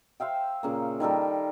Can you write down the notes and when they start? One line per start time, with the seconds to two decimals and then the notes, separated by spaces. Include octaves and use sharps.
0.20 C5 E5 F5 G5
0.63 A#2 C#3 A#3
1.00 D#3 G3 A4 A#4